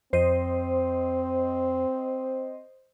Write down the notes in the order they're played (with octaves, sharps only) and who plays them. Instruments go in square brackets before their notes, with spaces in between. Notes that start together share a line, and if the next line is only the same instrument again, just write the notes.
[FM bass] F2 [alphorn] C4 [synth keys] C5 D#5